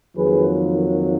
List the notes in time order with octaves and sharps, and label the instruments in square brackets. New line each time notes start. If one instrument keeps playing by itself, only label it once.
[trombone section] F2 D#3 F#3 A#3 G#4 B4